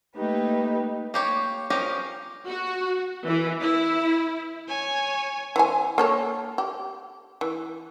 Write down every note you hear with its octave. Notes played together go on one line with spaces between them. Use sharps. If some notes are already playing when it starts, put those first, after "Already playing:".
A3 A#3 D#4 G4 B4
A#3 G4 C#5
F3 C#4 G4 G#4 A#4
F#4
E3
E4
C#5 G#5
E3 C5 G#5
A#3 A4 C#5
G4
E3